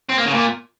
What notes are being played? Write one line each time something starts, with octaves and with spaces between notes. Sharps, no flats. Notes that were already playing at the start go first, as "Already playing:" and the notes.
C4
A#3
C#3
A#2